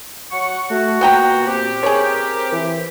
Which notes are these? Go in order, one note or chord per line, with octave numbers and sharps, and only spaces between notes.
F#3 F#5 C#6
A3 F#4
A#2 B3 G5 A#5
C4 G4
G#4 A#4 C#5
E3